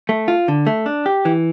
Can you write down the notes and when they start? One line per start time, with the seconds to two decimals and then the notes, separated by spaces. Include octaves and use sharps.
0.09 A3
0.28 F4
0.48 D3
0.67 A3
0.86 D4
1.06 G4
1.25 E3